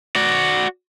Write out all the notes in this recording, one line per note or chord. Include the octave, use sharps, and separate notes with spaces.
F#4 D5